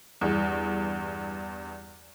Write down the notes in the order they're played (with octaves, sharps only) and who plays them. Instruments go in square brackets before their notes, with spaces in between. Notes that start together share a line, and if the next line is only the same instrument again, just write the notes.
[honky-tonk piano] E2 G2